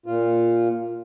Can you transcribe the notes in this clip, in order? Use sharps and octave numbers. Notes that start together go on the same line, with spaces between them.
A#2 F4